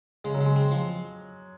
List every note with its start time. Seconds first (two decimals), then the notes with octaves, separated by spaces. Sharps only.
0.24 C#3 G#3
0.35 F#3
0.41 C#3 G#3
0.56 C4
0.71 F3